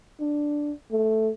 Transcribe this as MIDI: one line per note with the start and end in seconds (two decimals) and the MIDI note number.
0.21 0.72 62
0.92 1.29 57